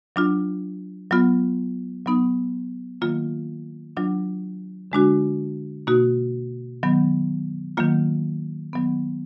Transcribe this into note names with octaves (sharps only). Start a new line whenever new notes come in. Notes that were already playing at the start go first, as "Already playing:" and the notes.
F#3 D4 F4
F#3 B3 F4
F#3 B3 D#4
D#3 F#3 A#3 F4
F#3 D4 F4
D3 G#3 D4 F#4
B2 A#3 D#4 F#4
D#3 F#3 B3
D#3 F#3 A#3 F4
D#3 F#3 B3